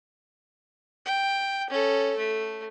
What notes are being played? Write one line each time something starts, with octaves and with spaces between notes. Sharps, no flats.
G5
C#4 A4
A3